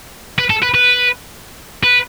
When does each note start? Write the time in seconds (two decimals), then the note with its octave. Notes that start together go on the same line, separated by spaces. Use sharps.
0.39 B4
0.50 A4
0.63 B4
0.75 B4
1.83 B4